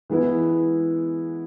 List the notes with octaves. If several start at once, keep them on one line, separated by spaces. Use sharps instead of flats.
E3 G#3 B3 E4 B4